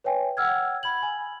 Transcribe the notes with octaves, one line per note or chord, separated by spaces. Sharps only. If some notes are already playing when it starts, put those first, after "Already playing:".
B4 C#5 E5 G5 G#5
F#5 G5 E6 F6 G#6
B5 G#6 F#7
G#5